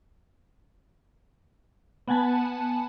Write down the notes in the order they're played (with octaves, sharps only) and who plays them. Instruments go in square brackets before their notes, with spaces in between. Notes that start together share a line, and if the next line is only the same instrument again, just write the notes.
[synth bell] B3 F#5 G#5 A5 B5